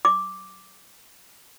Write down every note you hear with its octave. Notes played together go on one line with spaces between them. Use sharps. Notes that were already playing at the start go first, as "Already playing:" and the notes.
D6